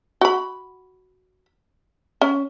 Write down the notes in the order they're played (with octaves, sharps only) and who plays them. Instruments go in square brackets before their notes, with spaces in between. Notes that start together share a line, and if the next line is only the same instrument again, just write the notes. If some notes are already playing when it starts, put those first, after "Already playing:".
[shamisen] F#4 B5
C#4